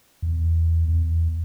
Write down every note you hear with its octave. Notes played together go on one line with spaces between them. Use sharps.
E2
E2